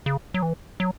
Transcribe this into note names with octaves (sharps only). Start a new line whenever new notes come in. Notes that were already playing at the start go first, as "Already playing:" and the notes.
C#3
F#3
E3
F#3